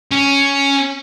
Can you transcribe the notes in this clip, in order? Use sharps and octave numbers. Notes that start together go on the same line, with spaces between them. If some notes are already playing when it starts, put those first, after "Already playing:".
C#4